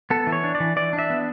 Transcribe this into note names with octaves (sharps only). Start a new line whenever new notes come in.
B3 A4
E3
C#5
D4
D5
E3
E3 D5
D4
E5
B3